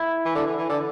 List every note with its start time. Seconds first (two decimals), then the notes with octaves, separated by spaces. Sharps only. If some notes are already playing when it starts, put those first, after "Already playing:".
Already playing: E4
0.26 E3
0.36 D3
0.47 E3
0.58 E3
0.70 D3